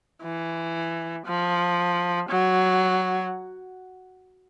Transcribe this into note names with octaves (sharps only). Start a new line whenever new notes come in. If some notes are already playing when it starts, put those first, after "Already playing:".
E3
F3
F#3